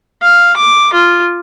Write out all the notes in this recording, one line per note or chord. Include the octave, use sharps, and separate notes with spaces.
F5
D6
F4